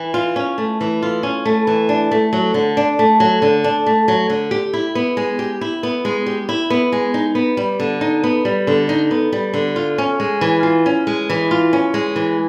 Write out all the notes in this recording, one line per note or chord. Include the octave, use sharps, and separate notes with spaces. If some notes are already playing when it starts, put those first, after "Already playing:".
Already playing: E3
F4
C#4
A3
E3
F4
C#4
A3
E3
D4
A3
F#3
D3
D4
A3
F#3
D3
D4
A3
F#3
D3
G4
E4
B3
G#3
G4
E4
B3
G#3
G4
E4
B3
G#3
D#4
B3
G3
D3
D#4
B3
G3
D3
D#4
B3
G3
D3
F4
C#4
G#3
E3
F4
C#4
G#3
E3
F4
C#4
G#3
E3